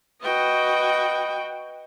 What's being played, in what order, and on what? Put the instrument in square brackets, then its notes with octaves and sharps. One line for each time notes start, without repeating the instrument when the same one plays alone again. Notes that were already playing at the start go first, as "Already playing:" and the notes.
[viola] F#4 G5 [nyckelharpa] B4 D#5